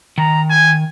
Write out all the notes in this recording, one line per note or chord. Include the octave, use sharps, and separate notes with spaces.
D#3 A#5
G#5